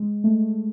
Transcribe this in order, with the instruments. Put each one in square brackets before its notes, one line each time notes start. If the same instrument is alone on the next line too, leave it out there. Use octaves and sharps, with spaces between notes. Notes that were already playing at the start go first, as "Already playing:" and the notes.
Already playing: [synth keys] G#3
A3